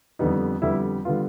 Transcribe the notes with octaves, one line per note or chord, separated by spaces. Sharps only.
F2 D3 G3 B3 D#4
F2 D3 G3 B3 E4
D3 G3 B3 F4